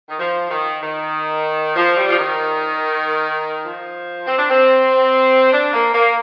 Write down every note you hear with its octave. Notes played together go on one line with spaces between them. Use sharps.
D#3
F3
D#3
D#3
F3
G3
F3
D#3
F3
C4
D4
C4
D4
A#3
A#3